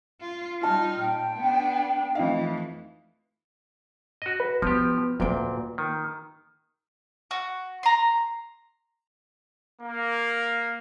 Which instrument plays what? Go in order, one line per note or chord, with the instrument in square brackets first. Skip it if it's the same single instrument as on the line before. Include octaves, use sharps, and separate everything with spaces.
[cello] F4
[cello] G3 D#4 [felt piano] F4 A5 [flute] F6
[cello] A#2 [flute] G5
[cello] B3 D4
[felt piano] F2 D#4 F5 [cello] E3 A3
[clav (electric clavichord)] F#4 D#5
[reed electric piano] B4
[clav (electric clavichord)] F3 G4 [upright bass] B3
[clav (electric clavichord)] D2 A#2 G5 [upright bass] A#3 F4
[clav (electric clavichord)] D#3
[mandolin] F#4
A#5 C6
[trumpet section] A#3